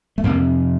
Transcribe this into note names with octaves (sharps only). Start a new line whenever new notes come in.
A3
F2 C3 A#3